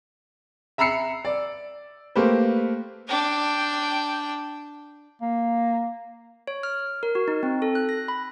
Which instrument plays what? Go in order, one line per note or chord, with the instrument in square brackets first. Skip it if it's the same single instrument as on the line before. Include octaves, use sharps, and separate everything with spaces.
[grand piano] E5 A#5 B5 E6 C7 C#7
D5
A3 A#3 G4 B4 C5
[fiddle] D4 G5
[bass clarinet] A#3
[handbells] C#5
F6
A#4
F#4
D#4
C4
A4
F#6
A#6
B5